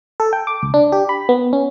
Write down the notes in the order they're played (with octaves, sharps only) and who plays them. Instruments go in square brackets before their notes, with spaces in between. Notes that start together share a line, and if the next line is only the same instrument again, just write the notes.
[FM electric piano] A4
G5
D6
C#2
D4
G4
B5
B3
C#4